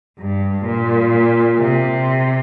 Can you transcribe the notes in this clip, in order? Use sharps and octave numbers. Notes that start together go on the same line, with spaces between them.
G2
A#2
C3